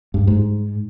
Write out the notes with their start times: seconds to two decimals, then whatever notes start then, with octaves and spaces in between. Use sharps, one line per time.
0.14 G2
0.27 G#2